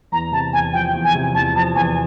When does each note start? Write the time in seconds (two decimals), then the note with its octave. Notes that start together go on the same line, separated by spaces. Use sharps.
0.12 E2 A#5
0.32 C3 A5
0.53 E2 G#5
0.73 F3 G5
0.94 E2
1.04 G#5
1.15 C3
1.34 E2 A5
1.56 F3 A5
1.75 E2 G#5